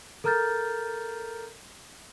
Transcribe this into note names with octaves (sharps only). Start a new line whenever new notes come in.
A4 A#4 A#5 F6 G6 A6